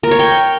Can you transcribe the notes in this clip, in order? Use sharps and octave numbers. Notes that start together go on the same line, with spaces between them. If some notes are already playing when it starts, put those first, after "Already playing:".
A#4
C#5
G5